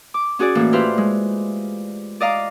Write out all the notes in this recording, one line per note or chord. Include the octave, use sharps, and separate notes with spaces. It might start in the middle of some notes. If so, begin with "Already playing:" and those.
D6
C#4 F#4 G#4 D5
A2 E3 A#3
E4 F4 G4 B4 C5 F5
G#3
D5 D#5 F5 A#5 D6